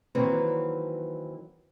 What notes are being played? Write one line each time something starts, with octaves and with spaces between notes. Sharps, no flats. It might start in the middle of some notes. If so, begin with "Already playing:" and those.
D#3 E3 F#3 A#3 C4 B4